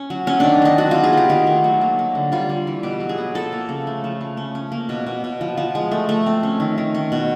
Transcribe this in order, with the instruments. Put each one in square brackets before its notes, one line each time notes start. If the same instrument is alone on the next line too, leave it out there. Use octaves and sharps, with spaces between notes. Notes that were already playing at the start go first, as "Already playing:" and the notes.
Already playing: [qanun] C#4
F#3
C4 C#4
D#3 D4
C4 D#4
F#3 F#4
B3 F4
G#4
B3 G4
D#3 F4
A3
F#3
A#3
A#3
D3
G3 F4
G3
E3
B2 G4
F#3
G#4
B3
F3 A4
A#3
C#3
A3
F3
C#3
C#4
C#4
A#3
B2
B2
B2
F3
F3
G#3
A3
A3
C4
C#4
D#3
D#3
C#4
B2